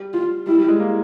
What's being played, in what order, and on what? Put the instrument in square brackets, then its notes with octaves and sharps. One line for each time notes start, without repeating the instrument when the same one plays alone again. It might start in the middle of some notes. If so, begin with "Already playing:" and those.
Already playing: [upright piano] G3
[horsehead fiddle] F4
[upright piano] G3 [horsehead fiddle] E4
[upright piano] G3
G#3
A#3